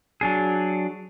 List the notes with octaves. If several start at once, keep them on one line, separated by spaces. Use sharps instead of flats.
F#3 D4 G#4